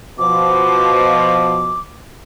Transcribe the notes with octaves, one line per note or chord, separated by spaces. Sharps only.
B2 F3 D6